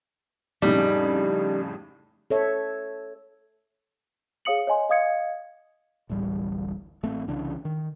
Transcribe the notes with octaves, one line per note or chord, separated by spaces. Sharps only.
F2 A2 C#3 G3 D#4
A4 C#5 E5
G#4 C#5 F5 D#6 C#7 F#7
C#5 D#5 G#5 C6
D#5 F5 D#6 G#6 C#7
D1 A1 G3
A1 A3 C4
C2 C#3 E3 D4
D#3